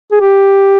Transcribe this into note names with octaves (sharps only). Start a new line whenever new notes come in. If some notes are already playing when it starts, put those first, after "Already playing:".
G#4
G4